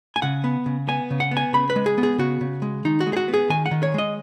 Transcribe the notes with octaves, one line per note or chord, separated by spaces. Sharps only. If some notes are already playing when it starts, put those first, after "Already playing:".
G#5
C#3 F#5
B3
C#3
B3 G#5
C#3
F#5
B3
G#5
C#3 B5
B4
G#3
G#4
B3
G#4
C#3 F#4
C#3
G#3
D#3 D#4
F#4
G#3
G#4
F#4
B3
G#4
D#3 G#5
F#5
D#3
C#5
G#3 D#5